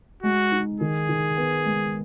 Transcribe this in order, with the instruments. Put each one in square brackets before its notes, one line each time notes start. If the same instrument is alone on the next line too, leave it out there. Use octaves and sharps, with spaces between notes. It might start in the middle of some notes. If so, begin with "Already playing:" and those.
[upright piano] G#3 [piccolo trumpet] F#4
[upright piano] D#4
[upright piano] D#3 [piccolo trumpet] G#4
[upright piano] D#3
B3
G#3